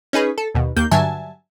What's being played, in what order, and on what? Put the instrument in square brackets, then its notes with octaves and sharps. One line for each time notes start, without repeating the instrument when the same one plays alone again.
[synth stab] C#4 D#4 G#4 B4
A4
D#2 B2
D#2 A#3 G6
G2 D3 F#3 E5 G#5 A5